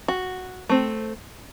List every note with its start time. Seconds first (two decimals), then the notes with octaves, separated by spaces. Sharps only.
0.08 F#4
0.69 A3 C4